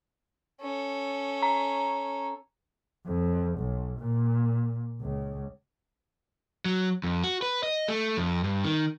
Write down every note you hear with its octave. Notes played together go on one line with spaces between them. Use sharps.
C#4 A4
A#5
F2
B1
A#2
C#2
F#3
F2
F#4
B4
D#5
A3
F2
G2
D#3